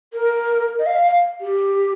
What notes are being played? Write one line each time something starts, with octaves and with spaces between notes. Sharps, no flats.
A#4
D#5
F5
F5
G4